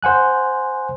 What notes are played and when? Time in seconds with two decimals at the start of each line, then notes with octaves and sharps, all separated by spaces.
0.03 C5 F#5 G#5 F#6